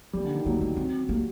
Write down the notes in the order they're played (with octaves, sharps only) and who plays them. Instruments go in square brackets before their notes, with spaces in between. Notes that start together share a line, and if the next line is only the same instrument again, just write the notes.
[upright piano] G3 [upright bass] A#3
[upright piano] D3
D#3
[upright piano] F#3 [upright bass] A#3
[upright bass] A#3
C4
[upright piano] G3 [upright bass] A#3